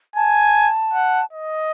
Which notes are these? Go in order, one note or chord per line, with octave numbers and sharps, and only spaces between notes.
G#5 A5
F#5
D#5